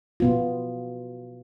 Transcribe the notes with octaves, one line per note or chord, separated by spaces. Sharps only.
B2 B3 F4